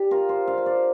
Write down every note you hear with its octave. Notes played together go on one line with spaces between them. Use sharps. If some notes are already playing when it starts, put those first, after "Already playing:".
Already playing: D4 G4
F4 A#4
C5
D4 F5
C5
D5